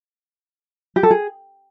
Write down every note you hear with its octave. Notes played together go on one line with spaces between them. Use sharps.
G4
A4
G#4